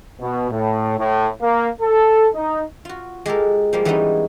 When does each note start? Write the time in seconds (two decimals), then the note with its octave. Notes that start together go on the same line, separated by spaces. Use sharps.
0.20 B2
0.51 A2
0.98 A2
1.40 A#3
1.80 A4
2.34 D#4
2.85 F4 F#4
3.26 G#3 G4 A4 A#4
3.73 F3 G3 G#3 A#3
3.85 E3 G3 G#3 B3 C#4 D#4